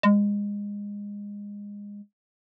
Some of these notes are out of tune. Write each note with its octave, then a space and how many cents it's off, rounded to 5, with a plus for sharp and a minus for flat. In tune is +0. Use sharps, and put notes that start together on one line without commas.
G#3 -25